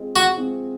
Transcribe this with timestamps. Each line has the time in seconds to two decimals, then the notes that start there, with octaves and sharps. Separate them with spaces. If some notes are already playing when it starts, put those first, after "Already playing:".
Already playing: G#3 C4 F4 G#4
0.16 F#4
0.37 G#3 C4 F4 G#4